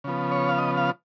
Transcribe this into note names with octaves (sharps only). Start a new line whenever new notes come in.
C#3 F3 B3
C#5
F5
D#5
F5